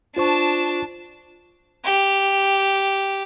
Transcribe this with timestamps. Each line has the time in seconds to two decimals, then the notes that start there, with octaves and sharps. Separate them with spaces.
0.17 D4 F4 C5 A5 C#6
1.85 G4